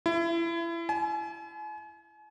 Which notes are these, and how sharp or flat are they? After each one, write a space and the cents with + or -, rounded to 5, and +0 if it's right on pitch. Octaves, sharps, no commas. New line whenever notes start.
E4 +30
G#5 +40